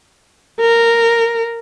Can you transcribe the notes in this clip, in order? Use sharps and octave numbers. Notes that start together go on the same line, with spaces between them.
A#4